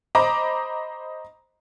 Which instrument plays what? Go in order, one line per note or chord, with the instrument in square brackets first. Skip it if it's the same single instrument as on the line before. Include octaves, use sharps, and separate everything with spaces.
[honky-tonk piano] C5 D#5 A#5 B5 D6